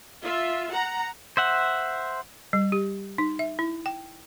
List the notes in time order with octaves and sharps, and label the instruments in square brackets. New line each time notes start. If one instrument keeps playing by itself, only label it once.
[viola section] F4 E5
F#5 A#5
[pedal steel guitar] C5 E5 F#5
[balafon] G3
G4
D#4
E5
E4
G5